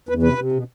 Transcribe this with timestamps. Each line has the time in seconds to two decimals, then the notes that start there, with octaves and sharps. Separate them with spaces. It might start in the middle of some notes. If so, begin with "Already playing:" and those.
0.09 E2 B4
0.23 C3 B4
0.38 C3
0.52 B2